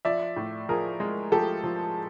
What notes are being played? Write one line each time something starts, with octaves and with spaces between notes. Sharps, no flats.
F3 D5 E5
A2
F3 G#4 A#4
G#3
F3 G4 A4
F3